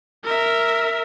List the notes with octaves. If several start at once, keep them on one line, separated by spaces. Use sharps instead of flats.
A#4 E5